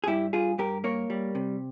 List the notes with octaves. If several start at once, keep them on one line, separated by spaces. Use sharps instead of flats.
G#4
G2 E4 G4
G2 F4 G#4
G2 G4 A#4
A#3 A#4 C#5
G3
C3